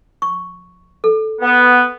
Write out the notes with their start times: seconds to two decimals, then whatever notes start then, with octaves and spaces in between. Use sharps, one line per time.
0.22 C#6
1.04 A4
1.42 B3